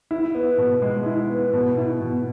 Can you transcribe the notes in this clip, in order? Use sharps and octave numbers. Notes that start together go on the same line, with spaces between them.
E4
B3
B2
G#3
E4
B3
B2
E4
B2